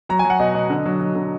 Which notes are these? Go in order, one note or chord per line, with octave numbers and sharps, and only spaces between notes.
F#3 A#5
G#5
F#3
F#5
B2 D#5
B2
D3
F#3
F#3
D3